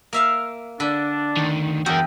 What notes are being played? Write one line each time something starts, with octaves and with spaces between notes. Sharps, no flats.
A#3 E5 F5
D3 D4 B5
D2 D#3
E2 F#4 A#4 G5